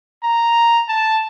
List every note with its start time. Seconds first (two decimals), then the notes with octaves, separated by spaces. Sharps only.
0.23 A#5
0.88 A5